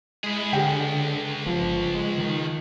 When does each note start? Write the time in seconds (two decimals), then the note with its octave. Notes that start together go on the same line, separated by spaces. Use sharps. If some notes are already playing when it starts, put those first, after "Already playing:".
0.24 G#3 E4 G#4
0.53 C#2 D3 G#4 G5
1.46 G1 F3
1.94 G#3
2.18 D#3